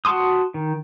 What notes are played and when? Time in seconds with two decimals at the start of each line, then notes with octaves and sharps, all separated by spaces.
0.05 F#4 F#5 A5 C6 D#6
0.54 D#3